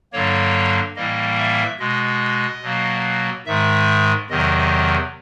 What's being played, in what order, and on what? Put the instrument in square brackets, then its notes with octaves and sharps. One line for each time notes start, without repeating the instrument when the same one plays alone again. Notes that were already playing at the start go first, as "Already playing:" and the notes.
[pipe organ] G2 D3 F#3 A#3 C#5
A2 E3 G3 A#3 D#5
E5
B2 G#3 D#5
B2 F#3 A#3
G#2 D#3 G#3 E5
E2 C3 D#3 F#3 D#5